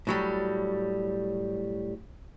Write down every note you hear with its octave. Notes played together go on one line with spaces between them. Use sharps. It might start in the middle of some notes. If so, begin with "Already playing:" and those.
A2 F#3 G3